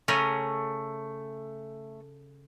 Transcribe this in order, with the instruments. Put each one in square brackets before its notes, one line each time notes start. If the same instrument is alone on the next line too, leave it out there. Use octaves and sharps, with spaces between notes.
[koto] C#3 C#4 A#4 [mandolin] A3